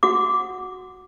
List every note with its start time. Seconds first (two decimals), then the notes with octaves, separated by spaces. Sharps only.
0.03 F#4 F#5 D6